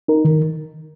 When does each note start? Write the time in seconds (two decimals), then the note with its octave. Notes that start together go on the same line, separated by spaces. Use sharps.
0.08 D#4 A#4
0.25 D#3